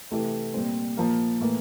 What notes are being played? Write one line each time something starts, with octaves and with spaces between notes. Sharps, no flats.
C3 E3 A3 E4 G4
A#2 G3 C4
A#2 F3 A#3
A2 E3 A#3